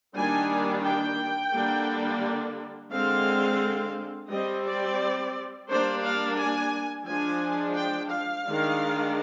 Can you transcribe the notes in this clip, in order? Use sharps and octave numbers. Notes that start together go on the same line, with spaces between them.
D#3 G3 A#3 D4 G#5
G5
D3 G3 A#3 D4
D3 G#3 C4 F5
G3 C4 D#5
D5
G3 A#3 D4 C5
F5
G#5
F3 G#3 D4 G#5
G5
F5
D#3 G#3 D4